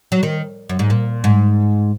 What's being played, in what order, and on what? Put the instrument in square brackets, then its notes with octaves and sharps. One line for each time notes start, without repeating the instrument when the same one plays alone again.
[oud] F#3
D#3
F#2
G#2
A#2
G#2